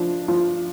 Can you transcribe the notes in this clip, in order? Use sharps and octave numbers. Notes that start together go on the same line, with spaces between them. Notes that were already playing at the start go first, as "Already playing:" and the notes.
Already playing: F3 D4
F3